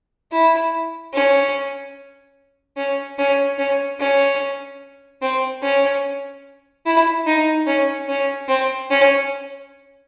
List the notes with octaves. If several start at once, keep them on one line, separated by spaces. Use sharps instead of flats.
E4
C#4
C#4
C#4
C#4
C#4
C4
C#4
E4
D#4
C#4
C#4
C4
C#4